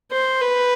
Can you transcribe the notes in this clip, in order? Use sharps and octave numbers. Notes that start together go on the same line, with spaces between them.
C5
B4